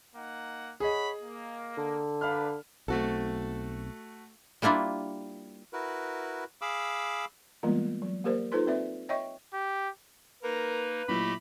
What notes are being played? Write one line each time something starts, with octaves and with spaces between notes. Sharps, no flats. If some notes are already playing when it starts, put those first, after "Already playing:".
A#3 D#4 F#5
G#4 C#5 D#5 F#5 B5
A#3
D3
D4 A#4 B4 F5 B5 F6
B1 A3 C4 F#4 A4
G3 A#3 D4 E4 F4
E4 F#4 A#4 B4
G#4 F5 B5 D6 E6
E3 G3 G#3 A#3 B3 F4
F#3
A#3 G4 A#4 C5 D5
D#4 F4 A4 B4 C5 C6
C4 B4 D5 E5
C#5 D#5 E5 G5 C#6
G4
A#3 D#4 A#4 B4
A#2 F#3 A3 E4 G4 D#5 B5